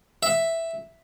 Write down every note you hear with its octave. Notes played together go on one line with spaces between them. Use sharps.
E5